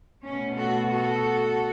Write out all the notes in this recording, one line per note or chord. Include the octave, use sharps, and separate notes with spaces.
B2 A3 C#4
F#4 A4
F#4 A4